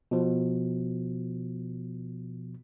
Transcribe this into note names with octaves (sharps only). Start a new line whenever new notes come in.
B2 F3